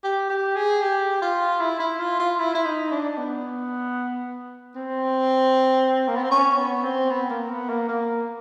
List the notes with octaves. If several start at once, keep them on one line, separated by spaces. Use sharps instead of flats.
G4
G4
G#4
G4
F4
E4
E4
F4
F4
E4
E4
D#4
D4
B3
C4
A#3
B3
C4
C#4
B3
C4
B3
A#3
B3
A#3
A#3